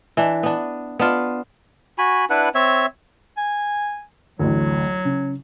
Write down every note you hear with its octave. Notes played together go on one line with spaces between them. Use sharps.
E3 D4
B3 D4
B3 D4 F4
F#4 G#5 B5
D4 E4 B4 F#5
C4 C#5 E5
G#5
A1 D2 F#3
C#3